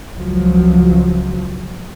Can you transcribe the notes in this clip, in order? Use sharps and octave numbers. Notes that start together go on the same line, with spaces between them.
C#2 F3 F#3